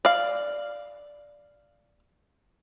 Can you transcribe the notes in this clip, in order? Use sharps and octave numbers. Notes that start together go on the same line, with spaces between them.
D5 F5